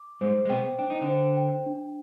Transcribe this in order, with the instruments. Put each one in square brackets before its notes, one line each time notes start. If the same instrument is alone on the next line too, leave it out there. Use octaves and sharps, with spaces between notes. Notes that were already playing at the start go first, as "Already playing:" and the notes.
Already playing: [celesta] D6
[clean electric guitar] G#2 G#3 [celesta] C5
[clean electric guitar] G#3
[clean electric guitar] B2 B3 [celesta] G5
[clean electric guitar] D4 [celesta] G5
[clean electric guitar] D#4
D3 D4
[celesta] C5
G5
D4